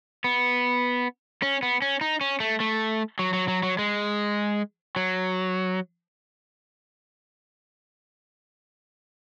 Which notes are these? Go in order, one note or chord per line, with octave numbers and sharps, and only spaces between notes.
B3
C#4
B3
C#4
D#4
C#4
A3
A3
F#3
F#3
F#3
F#3
G#3
F#3